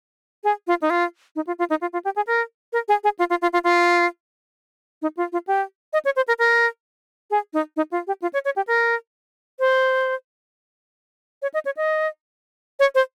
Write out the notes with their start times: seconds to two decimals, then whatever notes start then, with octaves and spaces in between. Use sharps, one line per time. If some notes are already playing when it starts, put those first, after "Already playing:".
0.44 G#4
0.67 F4
0.82 D#4
0.90 F4
1.36 D#4
1.47 F4
1.59 F4
1.70 D#4
1.81 F4
1.93 F4
2.05 G4
2.16 G#4
2.27 A#4
2.73 A#4
2.88 G#4
3.04 G#4
3.19 F4
3.30 F4
3.42 F4
3.53 F4
3.64 F4
5.02 D#4
5.17 F4
5.32 F4
5.47 G4
5.93 D#5
6.05 C#5
6.16 C5
6.28 A#4
6.39 A#4
7.31 G#4
7.53 D#4
7.77 D#4
7.92 F4
8.07 G4
8.22 F4
8.33 C#5
8.45 C#5
8.56 G4
8.67 A#4
9.60 C5
11.42 C#5
11.54 D#5
11.65 C#5
11.77 D#5
12.80 C#5
12.95 C5